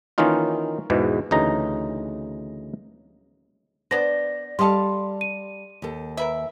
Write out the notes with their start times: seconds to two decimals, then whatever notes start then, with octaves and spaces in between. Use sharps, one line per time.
0.18 D#3 E3 A#3 C#4 D#4 F4
0.90 E2 G#2 B2 E3
1.31 D2 C#3 E3 D#4 A#5
3.91 B3 D4 C5 D5 A#6
4.59 G3 A4 D#5 F5 A5 C6
5.21 D#7
5.82 D#2 A4
6.17 A#4 B4 E5